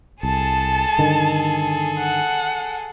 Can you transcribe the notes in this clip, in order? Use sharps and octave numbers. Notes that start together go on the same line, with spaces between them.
C2 G#4 A4 A5
G2 D3 D#3
F#5